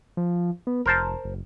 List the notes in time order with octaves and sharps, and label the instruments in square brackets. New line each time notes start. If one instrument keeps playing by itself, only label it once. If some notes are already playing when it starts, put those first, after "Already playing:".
[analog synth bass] F3
B3
[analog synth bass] F1 [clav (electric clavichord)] A#4 C5 A5
[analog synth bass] F#1